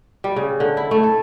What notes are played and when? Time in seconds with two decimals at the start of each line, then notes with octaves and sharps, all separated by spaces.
0.24 G3
0.36 C#3
0.60 D3
0.77 E4
0.91 A3
1.03 A4